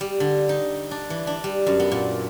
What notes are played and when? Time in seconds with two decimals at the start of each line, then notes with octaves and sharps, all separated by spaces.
0.01 G3
0.20 D3
0.49 D#4
0.91 D4
1.10 E3
1.27 D4
1.44 G3
1.67 F#2
1.80 B3
1.91 A#2